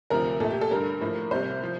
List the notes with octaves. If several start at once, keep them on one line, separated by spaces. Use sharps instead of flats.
D2 C3 F3 A#4
A#2 A3 A4
G4
A4
G2 D3 G3 A#3 A#4
A2 F3 A#3
C2 C3 G3 A#3 C5
F3